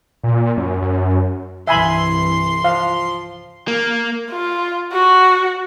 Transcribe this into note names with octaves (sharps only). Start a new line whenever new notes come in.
A#2
F#2
F#2
C2 G2 E3 E5 G#5 B5 C6
F3 F5
A#3
F4
F#4